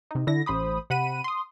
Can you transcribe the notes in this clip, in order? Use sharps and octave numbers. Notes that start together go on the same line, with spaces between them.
C3 D#4
D3 E4 A#6
A1 C5 B5 D#6
C3 F#5 B5 D#7
C6 D#6